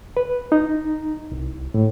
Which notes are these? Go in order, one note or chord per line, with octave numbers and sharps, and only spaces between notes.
B4
D#4
C2
A2